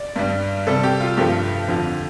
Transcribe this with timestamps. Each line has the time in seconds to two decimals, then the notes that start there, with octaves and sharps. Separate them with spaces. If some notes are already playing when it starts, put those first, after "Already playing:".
Already playing: D5
0.16 G2 G3
0.67 C3 G3 A4
0.83 G4
1.00 F4
1.17 G2 F3 A3 G4
1.68 F2 D3 F3